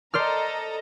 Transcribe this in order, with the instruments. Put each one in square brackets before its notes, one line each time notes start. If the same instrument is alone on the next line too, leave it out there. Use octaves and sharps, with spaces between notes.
[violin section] A4 D#5 A#5 [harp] C5 D5 F6